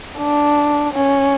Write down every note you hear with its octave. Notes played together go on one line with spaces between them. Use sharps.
D4
C#4